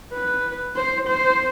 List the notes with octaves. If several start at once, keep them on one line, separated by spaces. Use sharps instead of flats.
B4
C5
C5